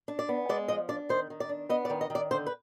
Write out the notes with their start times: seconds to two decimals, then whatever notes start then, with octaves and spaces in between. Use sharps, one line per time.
0.08 D4
0.19 D5
0.29 B3
0.49 G#3 D5
0.68 F3 D#5
0.89 D4 D5
1.09 D#3 C5
1.30 D#3
1.40 D5
1.49 D4
1.69 B3 D#5
1.85 D5
1.90 D#3
2.01 D#5
2.10 D#3
2.15 D5
2.31 D3 C5
2.46 B4